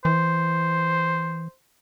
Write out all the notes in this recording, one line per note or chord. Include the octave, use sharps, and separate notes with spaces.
E3 C5